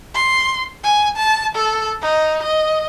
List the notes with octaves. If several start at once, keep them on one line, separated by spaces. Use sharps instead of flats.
C6
G#5
A5
A4
D#4
D#5